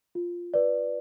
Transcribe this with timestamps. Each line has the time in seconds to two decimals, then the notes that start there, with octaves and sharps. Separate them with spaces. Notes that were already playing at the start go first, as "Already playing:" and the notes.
0.15 F4
0.54 B4 D5